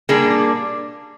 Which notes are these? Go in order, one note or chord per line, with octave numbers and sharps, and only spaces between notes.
A#2 G3 A#3 D4 G#4